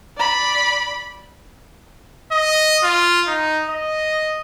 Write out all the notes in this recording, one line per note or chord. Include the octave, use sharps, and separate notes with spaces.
D5 B5
D#5
F4
D#4
D#5